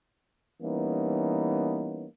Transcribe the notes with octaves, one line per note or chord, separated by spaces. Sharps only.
E3 G3 A#3 B3 C#4 D#4